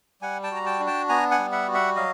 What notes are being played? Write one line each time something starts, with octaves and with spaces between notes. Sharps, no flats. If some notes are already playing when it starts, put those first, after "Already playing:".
G3 F#5 G#5
G5 A5
F#4 A#5
G5 A5
D4
G5 A5
B3 G#5 A#5
F#5 G#5
G3
E5 F#5
F#4
E5 F#5
F#3 D#5 F5